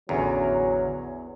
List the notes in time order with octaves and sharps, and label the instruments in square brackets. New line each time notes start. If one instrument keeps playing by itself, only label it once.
[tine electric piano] A1 D3 [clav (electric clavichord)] E2 [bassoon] F#3 [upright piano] C#4 E5 A#5